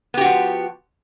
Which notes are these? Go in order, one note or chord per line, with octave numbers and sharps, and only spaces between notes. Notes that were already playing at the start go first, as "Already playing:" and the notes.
F3 B3 F#4 G4